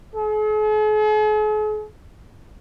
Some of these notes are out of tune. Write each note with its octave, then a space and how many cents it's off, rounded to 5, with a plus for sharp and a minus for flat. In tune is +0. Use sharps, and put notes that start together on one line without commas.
G#4 +45